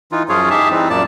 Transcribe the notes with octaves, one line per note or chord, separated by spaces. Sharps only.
E3 D#4 F4
F#2 F3 C#4 F4 G#4 C#5
D#4 G4 G#4 E5 A5
E3 G3 C4 D#4
F#2 A#2 A#3 D5 A5